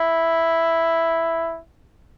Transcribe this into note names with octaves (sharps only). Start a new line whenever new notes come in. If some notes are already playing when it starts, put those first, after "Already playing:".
Already playing: E4